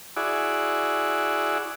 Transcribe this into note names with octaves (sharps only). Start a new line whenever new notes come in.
E4 F#4 G#4 D5